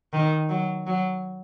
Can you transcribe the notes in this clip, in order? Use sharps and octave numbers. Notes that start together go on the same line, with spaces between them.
D#3
F#3
F#3